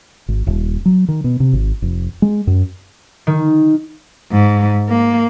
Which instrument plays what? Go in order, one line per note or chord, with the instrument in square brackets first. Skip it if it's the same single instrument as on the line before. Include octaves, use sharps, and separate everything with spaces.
[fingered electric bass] G#1
D#1
F#3
D#3
B2
C3
G#1
F1
G#3
F#2
[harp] D#3
[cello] G#2
A#3